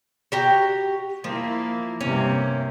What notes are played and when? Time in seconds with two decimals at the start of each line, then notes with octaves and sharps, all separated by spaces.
0.32 F#4 G4 A#5
1.24 F3 A#3 E4
2.01 G2 C3 A#3 C#4